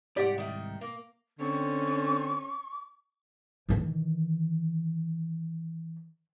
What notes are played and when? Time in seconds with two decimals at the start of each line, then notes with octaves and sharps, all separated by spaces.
0.17 C2 G#2 G4 D5 F#5
0.38 D#3 A3
0.81 A#3
1.40 D3 C4 C#4 C#6
3.69 D#3 E3